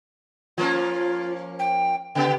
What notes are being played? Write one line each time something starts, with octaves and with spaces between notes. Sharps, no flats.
F3 A#3 C#4 F4
G5
C#3 B3 G4 G5